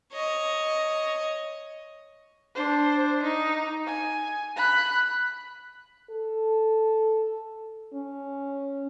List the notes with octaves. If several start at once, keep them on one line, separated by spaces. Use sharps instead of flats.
C#5 D#5
D4 C5
D#4
G#5
B5 F#6
A4
C#4